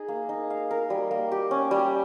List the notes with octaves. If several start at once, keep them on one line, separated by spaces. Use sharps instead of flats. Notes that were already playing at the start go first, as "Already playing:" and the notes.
Already playing: D#4 G#4
A#3
D#4
F5
A#4
G3
A#3
G4
C#4
G3